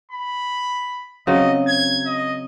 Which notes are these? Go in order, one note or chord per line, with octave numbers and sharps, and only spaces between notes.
B5
C#3 F#3 C4 D#5
G#6
D#5